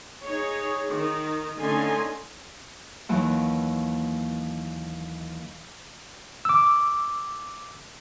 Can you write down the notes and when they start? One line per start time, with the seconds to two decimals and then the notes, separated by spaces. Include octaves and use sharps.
0.25 D#4 G#4 C#5
0.90 D#3
1.60 D3 A3 C#4 D#4 G#5 C6
3.09 D#2 E3 F#3 A#3
6.45 D6 E6